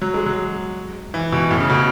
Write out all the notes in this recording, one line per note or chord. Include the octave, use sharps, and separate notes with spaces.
F#3
G#3
F#3
E3
B2
A2
C#3
B2